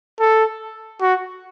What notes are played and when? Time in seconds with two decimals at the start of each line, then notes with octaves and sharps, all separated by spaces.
0.20 A4
1.01 F#4